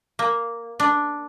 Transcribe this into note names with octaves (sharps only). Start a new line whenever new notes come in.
A#3
D4